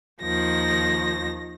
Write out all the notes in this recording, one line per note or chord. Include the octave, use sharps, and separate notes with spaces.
D#2 D#3 F3 A#6